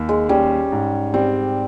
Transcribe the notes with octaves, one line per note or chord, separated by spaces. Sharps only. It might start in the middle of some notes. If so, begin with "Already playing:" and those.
Already playing: D#2
G#3
G3 C#4
G#2
G3 C4